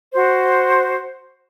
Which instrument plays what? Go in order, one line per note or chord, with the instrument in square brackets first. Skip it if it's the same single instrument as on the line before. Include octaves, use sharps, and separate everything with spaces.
[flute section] F#4 C5